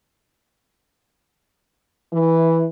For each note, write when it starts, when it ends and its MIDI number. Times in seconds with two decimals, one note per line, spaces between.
2.13 2.65 52